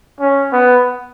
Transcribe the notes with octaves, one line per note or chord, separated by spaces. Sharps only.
C#4
B3